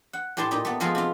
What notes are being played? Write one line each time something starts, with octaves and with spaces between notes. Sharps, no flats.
F#5
A2 G4 G#5 A5 C6
A#2 D#4 G4
A3 B3
F3 G#3 B3 F4 G#4 A4
C3 F4